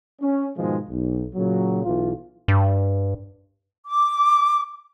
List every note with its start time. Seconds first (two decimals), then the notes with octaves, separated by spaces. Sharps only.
0.21 C#4
0.57 G#2 B2 D#3 F3 G#3
0.90 B1
1.35 A#2 C#3 F#3
1.83 B1 E3 F4
2.48 G2
3.86 D6